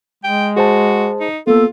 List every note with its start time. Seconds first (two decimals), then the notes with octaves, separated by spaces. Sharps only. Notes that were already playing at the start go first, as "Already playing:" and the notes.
0.24 G#3 G5
0.57 F#4 G#4 C5 A5
1.20 D#4
1.47 A#3 B3 F4 A4